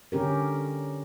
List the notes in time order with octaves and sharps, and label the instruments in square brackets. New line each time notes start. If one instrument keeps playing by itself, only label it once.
[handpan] D3 C#4 G4 A#4